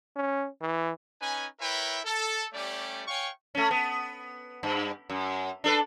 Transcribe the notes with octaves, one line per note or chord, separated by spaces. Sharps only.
C#4
E3
C#4 D#4 B4 G#5
E4 A#4 B4 C#5 E5 G5
A4
G3 A3 C#4 G4 D5
C#5 F5 G5 G#5 C#6
A3 C#4
B3
G2
F#2
D4 A4 B4